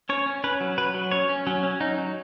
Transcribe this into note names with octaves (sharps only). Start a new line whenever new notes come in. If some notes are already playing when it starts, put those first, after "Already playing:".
C#4 C#5
C#4
C#4 B4
F#3
F#3 B4
F#3
C#4 C#5
C#4
F#3 C#4
C#4
F#3 D#4
F#3